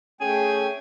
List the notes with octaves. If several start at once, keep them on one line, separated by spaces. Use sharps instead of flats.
A3 C#4 G#4 G5 G#5